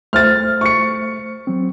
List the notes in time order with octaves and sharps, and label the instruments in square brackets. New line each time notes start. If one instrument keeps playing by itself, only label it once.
[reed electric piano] A3 C5 [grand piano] F6 A6
[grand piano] C#6 C#7
[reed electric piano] F#3 C4